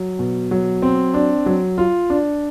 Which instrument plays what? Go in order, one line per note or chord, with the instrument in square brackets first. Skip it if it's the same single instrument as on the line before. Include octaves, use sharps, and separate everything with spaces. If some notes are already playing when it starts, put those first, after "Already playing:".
Already playing: [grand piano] F#3
B2
F#3
C4
D4
F#3
F4
D4